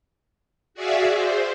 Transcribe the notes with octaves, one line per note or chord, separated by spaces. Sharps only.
F#4 G#4 D5 E5 F5
C5